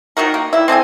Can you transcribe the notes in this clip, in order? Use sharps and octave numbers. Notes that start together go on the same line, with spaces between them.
D#3 D#4 F#4 A#4
A#3
G3 E4
C4 A4 D#5 G#5